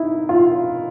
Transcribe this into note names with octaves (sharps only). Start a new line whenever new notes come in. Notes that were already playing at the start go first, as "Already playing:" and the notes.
Already playing: D#4 E4
F4